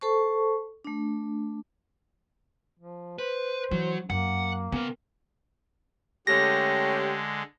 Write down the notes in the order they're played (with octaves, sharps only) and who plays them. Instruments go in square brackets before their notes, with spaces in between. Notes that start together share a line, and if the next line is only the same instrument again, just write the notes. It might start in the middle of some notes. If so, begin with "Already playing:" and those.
[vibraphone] A4 C5 A5 C#6
A3 D4
[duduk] F3
[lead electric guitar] B4 [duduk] C5
[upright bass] E3 [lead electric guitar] F#3
[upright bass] F#2 [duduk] A#3 [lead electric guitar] F#5
[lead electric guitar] C#3 A#4 [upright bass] B3
[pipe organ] D3 G#3 [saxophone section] A3 C#4 G4 [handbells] A#6